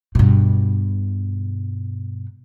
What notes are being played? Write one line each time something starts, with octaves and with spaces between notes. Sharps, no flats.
G2 B2